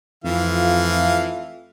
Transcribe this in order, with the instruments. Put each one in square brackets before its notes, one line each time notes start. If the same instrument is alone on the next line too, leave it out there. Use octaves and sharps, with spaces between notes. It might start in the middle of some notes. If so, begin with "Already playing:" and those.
[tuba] F2 [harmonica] E3 F5 [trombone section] A3 F4